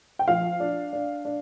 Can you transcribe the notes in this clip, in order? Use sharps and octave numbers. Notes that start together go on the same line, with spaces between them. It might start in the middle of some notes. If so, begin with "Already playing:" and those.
G5
F3 F5
D4
D4
D4